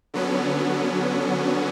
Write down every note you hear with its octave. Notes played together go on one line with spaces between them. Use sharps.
D3 F#3 B3 C#4